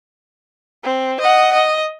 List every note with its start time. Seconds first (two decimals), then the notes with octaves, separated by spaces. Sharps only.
0.84 C4
1.21 D#5 F#5
1.53 D#5